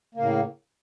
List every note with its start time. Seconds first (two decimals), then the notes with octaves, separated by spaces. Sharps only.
0.15 A#3
0.17 C#3
0.20 A2